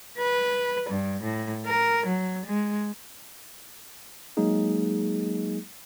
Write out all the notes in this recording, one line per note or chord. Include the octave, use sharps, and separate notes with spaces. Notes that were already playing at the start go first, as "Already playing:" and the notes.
B4
G2
A2
A#4
F#3
G#3
F#3 G#3 A#3 D#4 G#4